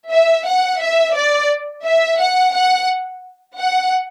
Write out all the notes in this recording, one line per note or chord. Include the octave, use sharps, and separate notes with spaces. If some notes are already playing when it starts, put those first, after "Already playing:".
E5
F#5
E5
D5
E5
F#5
F#5
F#5